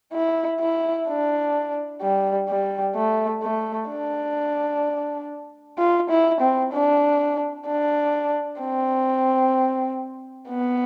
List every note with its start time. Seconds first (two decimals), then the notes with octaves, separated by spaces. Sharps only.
0.13 E4
0.61 E4
1.08 D4
2.02 G3
2.49 G3
2.95 A3
3.43 A3
3.90 D4
5.78 F4
6.10 E4
6.41 C4
6.73 D4
7.67 D4
8.61 C4
10.49 B3